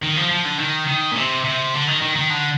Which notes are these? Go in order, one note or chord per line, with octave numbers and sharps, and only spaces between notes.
D#3
F3
F3
D3
D#3
D#3
A#2
C3
C3
D3
D#3
D#3
D#3
D3